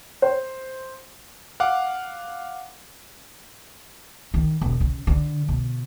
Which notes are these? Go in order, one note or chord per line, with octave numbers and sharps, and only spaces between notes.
C5
F5 F#5 D6
D#3
E1
C#3
D3
B2